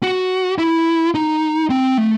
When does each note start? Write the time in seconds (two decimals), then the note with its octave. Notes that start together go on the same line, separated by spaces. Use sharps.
0.03 F#4
0.59 E4
1.15 D#4
1.70 C4
1.98 A3